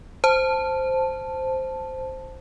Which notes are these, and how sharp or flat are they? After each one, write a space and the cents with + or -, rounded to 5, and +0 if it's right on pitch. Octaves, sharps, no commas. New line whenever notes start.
C5 +0 A5 +0